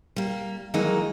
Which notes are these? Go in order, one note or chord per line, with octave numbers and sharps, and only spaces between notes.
G3 A#3
D#3 E3 F#3 G#3 A#3 D#4